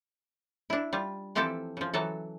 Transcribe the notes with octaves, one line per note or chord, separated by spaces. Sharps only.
D4 E4
G3 F4
E3 F3 C4 E4 G4 A4
C#3 F3
E3 F#3 A4